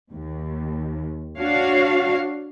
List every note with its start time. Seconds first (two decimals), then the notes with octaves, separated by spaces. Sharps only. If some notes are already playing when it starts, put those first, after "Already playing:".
0.12 D#2
1.38 D4 F#4 C#5 F5